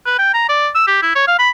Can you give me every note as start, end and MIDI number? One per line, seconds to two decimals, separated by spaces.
0.06 0.15 71
0.18 0.34 79
0.34 0.47 82
0.49 0.69 74
0.75 0.84 88
0.87 0.97 67
1.02 1.14 64
1.16 1.24 73
1.27 1.37 77
1.39 1.50 83